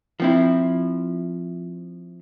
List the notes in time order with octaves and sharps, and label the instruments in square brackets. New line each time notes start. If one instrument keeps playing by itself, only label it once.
[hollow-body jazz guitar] F3 C4 E4